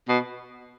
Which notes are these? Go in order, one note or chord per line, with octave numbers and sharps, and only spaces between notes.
B2